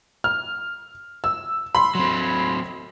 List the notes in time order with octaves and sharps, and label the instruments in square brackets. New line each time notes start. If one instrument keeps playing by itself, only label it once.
[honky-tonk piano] F6
E6
B5 C6
[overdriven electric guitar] F#3 C4